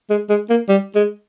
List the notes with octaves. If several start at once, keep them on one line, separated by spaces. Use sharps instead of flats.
G#3
G#3
A#3
G3
G#3